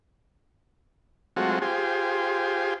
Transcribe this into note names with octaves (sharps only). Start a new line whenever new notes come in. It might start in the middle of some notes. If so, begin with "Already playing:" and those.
F#3 G#3 A3 C4 F4 F#4
F4 G4 G#4 C5